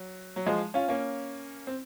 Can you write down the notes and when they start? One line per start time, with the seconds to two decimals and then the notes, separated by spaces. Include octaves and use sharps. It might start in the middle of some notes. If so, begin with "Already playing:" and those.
Already playing: F#3
0.36 F#3
0.46 F3 G#3
0.74 C#4 F4
0.88 A#3 C#4
1.67 C4